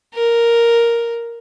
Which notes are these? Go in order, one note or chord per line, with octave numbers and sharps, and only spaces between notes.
A#4